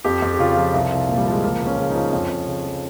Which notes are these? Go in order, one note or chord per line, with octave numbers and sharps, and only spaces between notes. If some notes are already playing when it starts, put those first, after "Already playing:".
F2 G4
F2
G4
C#3 F4
F3
C2
C2
A#2
G3
F3 G#3
C#2 A#3
C#2
C#4
C#3
D#4
F3
F2 C#4
F2
C#3
F3